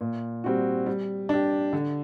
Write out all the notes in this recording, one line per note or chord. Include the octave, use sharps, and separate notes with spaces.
A#2
G3 C4 F#4
G3
D4 G4
D3